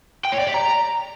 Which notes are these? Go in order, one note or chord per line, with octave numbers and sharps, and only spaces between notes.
G5
C#5
D5
G4
A#5